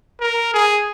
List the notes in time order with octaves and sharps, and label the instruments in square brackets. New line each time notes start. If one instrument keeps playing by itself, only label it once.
[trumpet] A#4
G#4